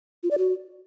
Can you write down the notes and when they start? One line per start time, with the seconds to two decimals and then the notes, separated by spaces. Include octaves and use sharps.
0.23 F4
0.31 D5
0.38 F#4